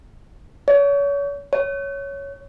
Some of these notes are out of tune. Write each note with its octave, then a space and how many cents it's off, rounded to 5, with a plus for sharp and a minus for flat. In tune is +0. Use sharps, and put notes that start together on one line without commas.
C#5 +35
C#5 +5